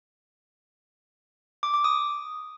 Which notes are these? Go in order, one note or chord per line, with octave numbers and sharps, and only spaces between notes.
D6
D6
D#6